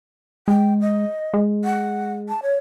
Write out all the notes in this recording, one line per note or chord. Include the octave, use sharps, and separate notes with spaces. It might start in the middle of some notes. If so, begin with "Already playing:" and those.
G#3 G5
D#5
G#3
F#5
A5
C#5